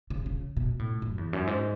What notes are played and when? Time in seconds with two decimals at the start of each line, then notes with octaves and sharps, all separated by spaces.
0.10 C#3
0.26 C#3
0.57 B2
0.79 A2
1.02 F#2
1.18 E2
1.33 F#2
1.47 G#2